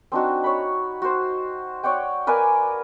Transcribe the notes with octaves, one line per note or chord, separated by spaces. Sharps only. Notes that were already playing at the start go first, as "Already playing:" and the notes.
C4 D4 D#4 F#4
C#5 B5
F#4 C5
C#5 D5 F#5 G5
A#4 B4 D5 G#5